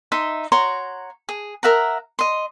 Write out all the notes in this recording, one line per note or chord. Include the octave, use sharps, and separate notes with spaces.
D#4 E5 C6
F#4 C#5 A#5 C6
G#4
A#4 E5 F#5 A#5
D#5 C6